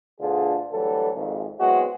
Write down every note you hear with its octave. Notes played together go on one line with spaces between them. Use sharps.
D2 B2 D3 F4 G#4
D2 E3 F#3 G3 A4
G#1 F2
F#3 G#3 B3 C4 E4 F#4